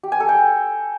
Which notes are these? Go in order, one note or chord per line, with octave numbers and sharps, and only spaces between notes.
G4
G#5
A4
G5